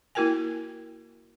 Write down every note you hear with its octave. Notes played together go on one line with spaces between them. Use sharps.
A#3 E4 F#4 A#4 G5 G#5